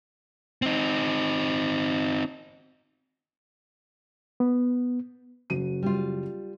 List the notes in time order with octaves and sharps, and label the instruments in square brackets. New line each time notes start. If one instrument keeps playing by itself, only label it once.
[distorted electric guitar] C4 D#4
[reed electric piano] B3
[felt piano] F#1 F#4 D#7
[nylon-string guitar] G3 F4